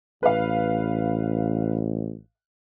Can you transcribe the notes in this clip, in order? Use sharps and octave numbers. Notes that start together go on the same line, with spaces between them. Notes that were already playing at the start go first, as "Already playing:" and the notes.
A1 B4 F5